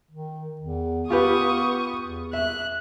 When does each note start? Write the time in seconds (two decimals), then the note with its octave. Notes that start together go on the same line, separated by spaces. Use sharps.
0.11 D#3
0.61 E2
1.10 B3 F4 G4 B4 C#6 D#6
2.01 E2
2.33 E5 F#6